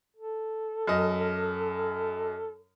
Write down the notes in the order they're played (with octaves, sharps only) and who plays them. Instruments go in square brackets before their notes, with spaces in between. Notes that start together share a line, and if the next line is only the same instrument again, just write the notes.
[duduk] A4
[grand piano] F#2 D#5